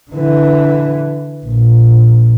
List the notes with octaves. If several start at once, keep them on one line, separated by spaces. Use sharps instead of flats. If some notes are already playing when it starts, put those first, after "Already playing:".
D3 E3
A#1